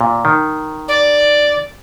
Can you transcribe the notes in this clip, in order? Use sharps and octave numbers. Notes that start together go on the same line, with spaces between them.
A#2
D#3
D5